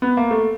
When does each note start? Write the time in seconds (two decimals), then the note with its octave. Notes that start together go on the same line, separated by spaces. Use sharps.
0.02 B3
0.17 A#3
0.31 A3